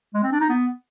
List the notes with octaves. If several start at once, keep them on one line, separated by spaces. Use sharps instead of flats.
G#3
C4
D4
D#4
B3